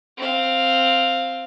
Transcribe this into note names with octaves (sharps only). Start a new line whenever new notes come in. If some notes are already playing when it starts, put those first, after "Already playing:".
C4 F5